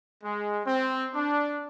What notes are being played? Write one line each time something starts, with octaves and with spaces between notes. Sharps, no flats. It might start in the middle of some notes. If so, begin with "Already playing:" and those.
G#3
C4
D4